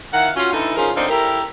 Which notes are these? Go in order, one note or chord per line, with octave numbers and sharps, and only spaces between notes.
D#3 E4 F5 F#5
C#4 F4 F#4
D3 E3 D#4 E4 A4
F3 C#4 D#4 F4 G#4 A#4
D3 F#3 C4 D#4 D5 F5
E4 G4 A4 A#4